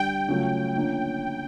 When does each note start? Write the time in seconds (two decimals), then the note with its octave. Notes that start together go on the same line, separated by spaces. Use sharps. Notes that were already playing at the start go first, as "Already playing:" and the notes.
Already playing: G2 D3 G3 G5
0.28 C#3 F#3 A3 C#4 F4
0.76 D3 F3 A#3 C#4